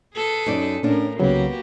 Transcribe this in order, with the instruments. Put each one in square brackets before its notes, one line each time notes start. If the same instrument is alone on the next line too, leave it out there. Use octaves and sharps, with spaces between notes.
[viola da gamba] G#4 A4 B4
[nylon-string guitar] F#2 D#4 D5
[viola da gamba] A2 A#4 [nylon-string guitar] C#4 D4
[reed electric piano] C2 C#3 F#3 [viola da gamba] A#3 F#4 G4 [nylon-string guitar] B3